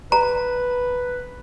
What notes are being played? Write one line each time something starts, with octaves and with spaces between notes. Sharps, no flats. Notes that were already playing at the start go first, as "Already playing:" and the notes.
B4 A#5